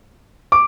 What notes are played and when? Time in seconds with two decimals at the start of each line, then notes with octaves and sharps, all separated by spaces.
0.52 D6